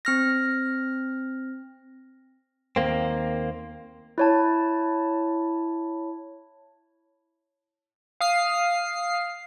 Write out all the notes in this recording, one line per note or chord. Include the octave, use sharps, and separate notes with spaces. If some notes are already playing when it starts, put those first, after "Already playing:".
C4 F6 A#6
D#2 A#3 C4
E4 C#5 A5
F5 D#6 C7